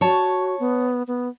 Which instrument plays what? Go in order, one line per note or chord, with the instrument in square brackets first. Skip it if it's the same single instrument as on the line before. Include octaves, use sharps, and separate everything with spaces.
[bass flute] F#4 [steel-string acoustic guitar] C#5 A5
[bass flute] B3
B3